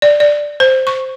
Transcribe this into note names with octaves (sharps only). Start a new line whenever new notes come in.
D5
D5
C5
C#6